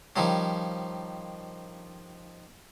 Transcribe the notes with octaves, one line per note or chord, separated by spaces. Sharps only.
D#3 F3 G3 C#4